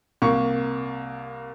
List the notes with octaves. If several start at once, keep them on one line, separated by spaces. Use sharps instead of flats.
C2 A#3 C#6